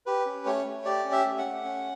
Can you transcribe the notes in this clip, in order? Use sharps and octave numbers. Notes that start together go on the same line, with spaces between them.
G4 B4
C#4
A3 C#5
A3
G4 D5
C#4
E5
A3
F#5
A3
C#4